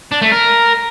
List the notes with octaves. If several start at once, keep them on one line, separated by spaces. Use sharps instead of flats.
D4
A3
A#4